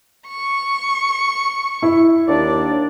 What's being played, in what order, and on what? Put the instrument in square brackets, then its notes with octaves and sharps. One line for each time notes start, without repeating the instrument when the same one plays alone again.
[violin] C#6
[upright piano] E4
[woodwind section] D#2 D4 D5